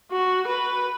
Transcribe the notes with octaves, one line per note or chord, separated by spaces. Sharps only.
F#4
B4